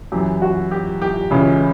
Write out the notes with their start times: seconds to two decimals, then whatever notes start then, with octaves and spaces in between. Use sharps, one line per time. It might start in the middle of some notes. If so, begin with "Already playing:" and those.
0.12 F#2 E3 G4
0.42 F#4
0.71 G4
1.02 G4
1.31 C#2 C#3 E3